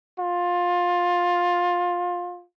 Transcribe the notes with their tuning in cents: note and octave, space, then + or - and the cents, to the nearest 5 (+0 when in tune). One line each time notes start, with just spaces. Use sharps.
F4 +20